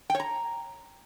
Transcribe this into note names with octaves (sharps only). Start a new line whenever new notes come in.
G5
C#5
A#5